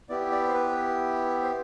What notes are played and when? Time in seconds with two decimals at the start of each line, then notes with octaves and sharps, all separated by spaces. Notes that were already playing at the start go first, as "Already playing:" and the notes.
0.09 B3 E4 G4 D5
0.32 D5
0.48 C5
0.54 B4
1.43 C5